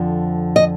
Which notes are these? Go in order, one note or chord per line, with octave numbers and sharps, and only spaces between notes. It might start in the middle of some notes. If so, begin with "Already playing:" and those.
Already playing: F2 D3 F3
D#5